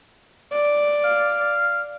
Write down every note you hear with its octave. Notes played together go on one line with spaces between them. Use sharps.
D5
F5